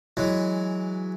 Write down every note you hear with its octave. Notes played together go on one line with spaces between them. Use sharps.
E3 F#3 G#3